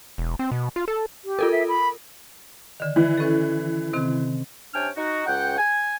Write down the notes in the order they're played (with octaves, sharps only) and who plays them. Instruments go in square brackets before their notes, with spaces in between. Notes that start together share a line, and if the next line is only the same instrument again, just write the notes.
[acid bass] E1
C4
B2
F4
A4
[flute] G4
[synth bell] F4 A4 A#4
[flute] E5
B5
[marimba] D3 D#3
[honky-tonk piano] E3
[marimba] C#4 A4
C3 D#3 C4
[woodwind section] C3 C#4 D4 G5 G#5 F6
D#4 F#4
C#2 F#5 G5
G#5